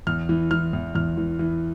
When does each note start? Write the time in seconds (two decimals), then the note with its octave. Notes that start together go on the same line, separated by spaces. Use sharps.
0.07 E2 F6
0.29 E3
0.51 E3 F6
0.73 E2
0.95 E2 F6
1.17 E3
1.39 E3